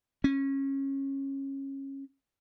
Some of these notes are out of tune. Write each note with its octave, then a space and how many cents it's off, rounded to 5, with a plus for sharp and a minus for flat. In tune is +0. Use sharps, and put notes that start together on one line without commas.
C#4 -20